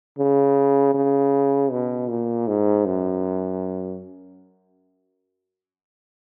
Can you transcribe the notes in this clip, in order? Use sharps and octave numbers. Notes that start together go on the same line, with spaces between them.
C#3
C#3
B2
A#2
G#2
F#2